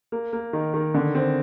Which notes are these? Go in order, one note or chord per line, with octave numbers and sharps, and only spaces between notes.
A#3
A#3
D#3
D#3
D3
C4